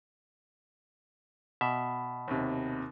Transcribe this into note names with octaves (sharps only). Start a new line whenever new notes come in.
B2 E5
D#2 C3